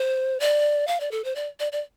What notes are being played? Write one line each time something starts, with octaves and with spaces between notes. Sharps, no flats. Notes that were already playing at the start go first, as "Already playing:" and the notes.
Already playing: C5
D5
F5
D5
A4
C5
D5
D5
D5